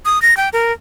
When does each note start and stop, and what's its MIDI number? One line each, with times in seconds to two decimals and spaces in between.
0.05 0.21 87
0.22 0.37 94
0.37 0.49 79
0.53 0.72 70